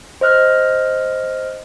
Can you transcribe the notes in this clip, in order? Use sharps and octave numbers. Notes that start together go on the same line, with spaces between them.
C5 D#5 F6 F#6